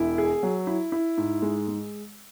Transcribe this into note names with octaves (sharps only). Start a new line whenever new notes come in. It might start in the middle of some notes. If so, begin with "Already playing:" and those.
Already playing: E1 E4
G#4
F#3
E4
E4
G#2
G#3
G#3